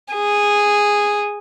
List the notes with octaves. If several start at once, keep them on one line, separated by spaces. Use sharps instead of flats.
G#4